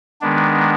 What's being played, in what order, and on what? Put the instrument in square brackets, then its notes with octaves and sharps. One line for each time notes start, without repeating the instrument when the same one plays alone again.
[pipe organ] D#3 G#3 B3 D4